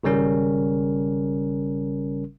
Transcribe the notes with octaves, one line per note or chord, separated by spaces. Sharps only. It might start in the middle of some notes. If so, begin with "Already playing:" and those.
G#1 C#3 G3 C#4 A#4